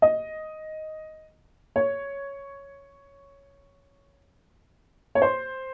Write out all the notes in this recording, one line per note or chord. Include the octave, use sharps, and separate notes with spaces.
D#5
C#5
C#5
C5